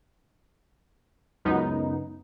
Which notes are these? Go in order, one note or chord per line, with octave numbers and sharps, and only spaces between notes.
C#2 F#2 B3 D#4